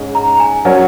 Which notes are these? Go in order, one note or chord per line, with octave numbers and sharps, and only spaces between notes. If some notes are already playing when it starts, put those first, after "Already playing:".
Already playing: G#2 G#3 C#4
A#5
G#5
F#3 C#4 A#4 C#5 F#5